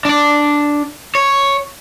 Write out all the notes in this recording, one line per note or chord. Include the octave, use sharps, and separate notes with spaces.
D4 D5
C#5